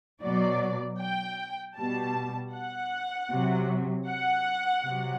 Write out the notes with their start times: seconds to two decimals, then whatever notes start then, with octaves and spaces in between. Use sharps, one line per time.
0.22 B2 F#3 D5
0.99 G5
1.76 B2 G3 A5
2.54 F#5
3.31 C3 F#3
4.07 F#5
4.84 C3 F#3